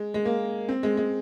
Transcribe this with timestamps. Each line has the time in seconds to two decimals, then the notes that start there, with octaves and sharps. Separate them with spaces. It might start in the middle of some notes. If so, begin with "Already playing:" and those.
Already playing: G#3
0.14 G#3
0.25 A#3
0.69 C4
0.83 G#3
0.97 G#3